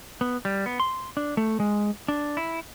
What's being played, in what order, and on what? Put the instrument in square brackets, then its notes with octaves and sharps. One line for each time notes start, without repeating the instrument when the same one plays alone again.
[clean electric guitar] B3
G3
B3
C6
D4
A3
G#3
D4
E4